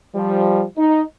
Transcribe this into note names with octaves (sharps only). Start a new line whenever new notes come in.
F3 G3
D#4